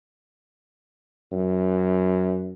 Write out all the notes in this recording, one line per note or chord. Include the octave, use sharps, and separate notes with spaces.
F#2